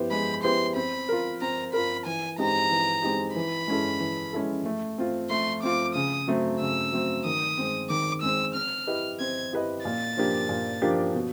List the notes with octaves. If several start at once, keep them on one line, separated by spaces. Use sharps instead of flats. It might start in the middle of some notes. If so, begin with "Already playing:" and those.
Already playing: B3 E4 G4 C5
G#3 B5
B3 E4 G4 C5 C6
C4 B5
F4 A#4
C4 A#5
F4 A#4 B5
E3 G#5
G#3 C4 D#4 G4 A#5
E3
G#3 C4 D#4 G4
E3 B5
G#3 C#4 E4 A4
E3
G#3 C#4 E4 A4
A3
C4 F4
A3 C6
C4 F4 D6
C#3 D#6
F#3 A3 C4
C#3 E6
F#3 A3 C4
D#3 D#6
G#3 C4
D#3 D6
G#3 C4 E6
C4 F6
E4 G4 B4 D#5
C4 G#6
E4 G4 B4 D#5
A#2 A6
F3 A#3 D4 G4
A#2
F3 A#3 D4 G4
B2